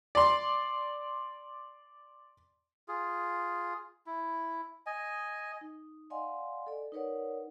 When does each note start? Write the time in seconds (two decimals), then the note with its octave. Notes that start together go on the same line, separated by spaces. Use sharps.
0.15 D5 C6
2.88 F4 G#4
4.06 E4
4.86 D#5 G#5
5.61 D#4
6.10 D5 D#5 F5 F#5 G#5 C6
6.67 A4 D5
6.92 D#4 A#4 B4 C#5 D5 F#5